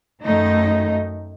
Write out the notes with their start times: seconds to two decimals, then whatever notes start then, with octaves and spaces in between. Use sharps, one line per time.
0.23 F#2 D#3 A3 D#4